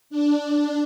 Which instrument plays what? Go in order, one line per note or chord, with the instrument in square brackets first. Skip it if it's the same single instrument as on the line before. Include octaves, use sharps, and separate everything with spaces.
[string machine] D4